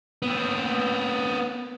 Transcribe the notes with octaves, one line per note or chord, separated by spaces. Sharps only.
B3 C4